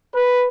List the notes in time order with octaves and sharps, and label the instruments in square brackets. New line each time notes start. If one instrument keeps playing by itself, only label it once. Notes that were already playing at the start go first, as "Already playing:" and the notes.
[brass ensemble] B4